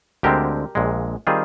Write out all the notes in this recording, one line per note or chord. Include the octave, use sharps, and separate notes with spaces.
D2 D3 G#3 C4 G4 A#4
A#1 A#2 G#3
D#3 G3 C4 F4 G#4